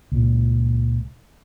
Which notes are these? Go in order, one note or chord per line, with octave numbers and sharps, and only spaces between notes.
C#2 A#2